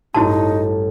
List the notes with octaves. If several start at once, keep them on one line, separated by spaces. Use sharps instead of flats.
A1 G2 D#4 E4 F#4 A5